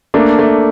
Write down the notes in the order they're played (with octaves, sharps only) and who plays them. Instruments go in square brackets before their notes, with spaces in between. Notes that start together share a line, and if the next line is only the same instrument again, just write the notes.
[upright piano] A3 [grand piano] A#3 D4
[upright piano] A3